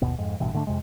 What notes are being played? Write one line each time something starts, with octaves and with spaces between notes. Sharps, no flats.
G1 D#2 B2 B3
F2 G#2
A1 G2 B2 E3
G#2 D3 A3 D4
F2 C3 G#3